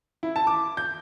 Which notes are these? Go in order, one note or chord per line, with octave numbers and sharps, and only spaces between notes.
E4
A5
D6
G6